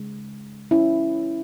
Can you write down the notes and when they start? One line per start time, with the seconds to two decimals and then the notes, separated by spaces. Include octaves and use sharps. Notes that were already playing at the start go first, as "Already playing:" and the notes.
Already playing: C#3 G#3
0.71 C#4 E4